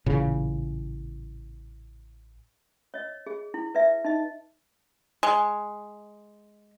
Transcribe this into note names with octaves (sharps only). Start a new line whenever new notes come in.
A1 A#2 C#3
C#5 D#5
G#4
E4
B4 D5 E5
D#4 D#5
G#3